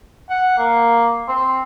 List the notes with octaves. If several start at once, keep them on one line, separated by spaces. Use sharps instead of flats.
F#5
A#3
C4